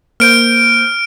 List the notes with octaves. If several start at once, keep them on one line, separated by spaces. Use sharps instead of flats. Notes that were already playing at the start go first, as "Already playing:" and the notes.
A#3 C5 F6 G6 D7